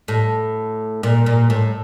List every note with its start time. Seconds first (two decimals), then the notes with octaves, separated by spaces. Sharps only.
0.08 A2
1.03 A#2
1.26 A#2
1.50 A2